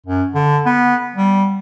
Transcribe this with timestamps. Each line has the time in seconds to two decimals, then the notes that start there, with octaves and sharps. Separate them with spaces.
0.07 F#2
0.35 D3
0.66 B3
1.16 G3